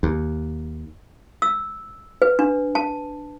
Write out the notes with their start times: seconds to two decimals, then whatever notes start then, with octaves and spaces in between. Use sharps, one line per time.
0.03 D#2
1.42 E6
2.22 B4
2.39 D4
2.75 A5